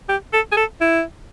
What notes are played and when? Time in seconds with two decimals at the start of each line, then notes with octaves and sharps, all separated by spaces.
0.09 G4
0.33 A4
0.52 G#4
0.57 A4
0.81 E4